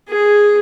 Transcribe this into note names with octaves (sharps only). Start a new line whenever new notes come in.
G#4